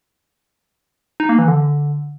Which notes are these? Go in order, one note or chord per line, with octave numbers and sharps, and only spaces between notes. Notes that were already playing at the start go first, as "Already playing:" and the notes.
D#4
A#3
E3
D3